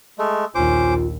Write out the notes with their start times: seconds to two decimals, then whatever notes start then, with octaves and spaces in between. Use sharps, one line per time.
0.18 G#3 A3
0.55 A#1 D#2 C#4 F4 C5 D6